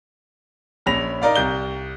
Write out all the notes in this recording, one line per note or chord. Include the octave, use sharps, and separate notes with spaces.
A#1 C#4 B5 A#6 F7
D#4 A#4 D5 F5
C2 G6 G7